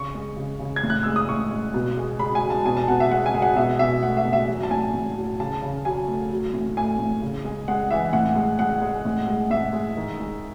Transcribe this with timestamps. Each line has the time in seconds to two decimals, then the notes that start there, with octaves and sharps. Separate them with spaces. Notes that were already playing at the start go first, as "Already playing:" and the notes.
Already playing: C#3 C#6
0.15 G#3
0.37 C#3
0.59 C#3
0.76 G#6
0.83 A2
0.90 F#6
1.03 G#3 E6
1.16 D#6
1.28 A2 C#6
1.51 G#3
1.74 B2
1.97 G#3
2.19 G#3 B5
2.35 G#5
2.43 G#3
2.50 A5
2.65 B2 G#5
2.77 A5
2.88 B2 F#5
3.00 E5
3.11 G#3 F#5
3.26 G#5
3.34 G#3
3.42 F#5
3.56 B2 E5
3.79 B2 E5
4.03 A3 F#5
4.17 E5
4.25 B2
4.33 E5
4.48 F#3
4.63 A5
4.71 A2 G#5
4.94 A2
5.17 F#3
5.39 C#3 A5
5.62 C#3
5.85 F#3 G#5
6.08 A3
6.31 F#3
6.54 A2
6.77 A3 G#5
6.99 A2
7.22 C#3
7.44 G#3
7.68 G#3 F#5
7.91 E3 E5
8.13 A2 F#5
8.36 G#3
8.59 G#3 F#5
8.81 G#3
9.05 A2
9.27 G#3
9.50 A2 E5
9.73 G#3
9.97 D#3
10.20 G#3